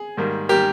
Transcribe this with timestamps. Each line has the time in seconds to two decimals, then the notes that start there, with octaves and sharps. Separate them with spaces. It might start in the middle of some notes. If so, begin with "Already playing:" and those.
Already playing: G#4
0.17 G#2 D#3 G3 A#3
0.49 D#3 G3 A#3 G4 A#4